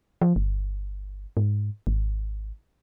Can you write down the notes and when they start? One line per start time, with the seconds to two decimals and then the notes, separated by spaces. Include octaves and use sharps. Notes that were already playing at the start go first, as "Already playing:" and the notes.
0.22 F3
0.36 G1
1.37 G#2
1.87 G#1